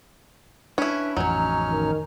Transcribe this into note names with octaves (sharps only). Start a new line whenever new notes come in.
C#4 D4 E4 B4
A1 F2 F#3 C#4 D#4 C#5 F6
D#3